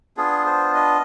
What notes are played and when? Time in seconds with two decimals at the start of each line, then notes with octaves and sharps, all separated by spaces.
0.17 B3 D4 F4 G#4
0.46 C5
0.75 D#5